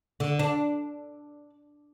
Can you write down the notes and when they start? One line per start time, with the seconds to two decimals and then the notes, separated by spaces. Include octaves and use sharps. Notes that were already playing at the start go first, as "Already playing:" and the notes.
0.20 D3
0.39 D4